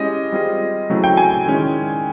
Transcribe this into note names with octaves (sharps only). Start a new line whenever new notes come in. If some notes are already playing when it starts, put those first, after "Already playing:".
Already playing: G#3 C#4 E4 G4 D#5
G3 C4 F4 G#4
C#3 F#3 A3 C4 E4
G5
G#5
D#3 G#3 C#4 E4